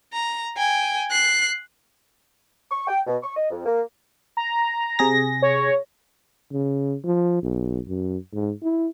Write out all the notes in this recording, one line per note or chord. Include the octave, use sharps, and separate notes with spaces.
A#5
G5 G#5
F#6 C7
C#6
G5
B2
C#6
D#5
F2
A#3
A#5
C3 G#4 A#6
C#5
C#3
F3
B1
F#2
G#2
E4